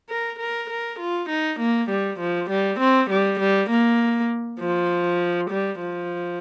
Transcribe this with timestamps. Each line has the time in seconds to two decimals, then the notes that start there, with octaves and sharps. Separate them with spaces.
0.10 A#4
0.39 A#4
0.70 A#4
0.99 F4
1.30 D#4
1.60 A#3
1.90 G3
2.20 F3
2.50 G3
2.79 C4
3.10 G3
3.40 G3
3.70 A#3
4.60 F3
5.50 G3
5.80 F3